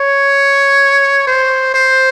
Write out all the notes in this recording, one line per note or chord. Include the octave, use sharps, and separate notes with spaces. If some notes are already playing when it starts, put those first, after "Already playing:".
Already playing: C#5
C5
C5